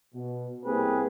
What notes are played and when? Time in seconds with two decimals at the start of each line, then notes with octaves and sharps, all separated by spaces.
0.15 B2
0.65 C2 A#3 C4 G4 G#4 B4